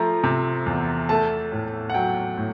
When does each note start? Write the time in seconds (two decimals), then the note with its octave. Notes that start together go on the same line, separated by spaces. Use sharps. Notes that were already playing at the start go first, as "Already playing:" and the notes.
Already playing: F3 A3 A#5
0.24 C3
0.66 E2
1.09 A3 A5
1.52 A2
1.90 F#5
1.94 F#3 G5
2.37 A2